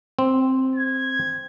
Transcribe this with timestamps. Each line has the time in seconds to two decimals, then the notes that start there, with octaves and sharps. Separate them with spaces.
0.19 C4
0.76 G#6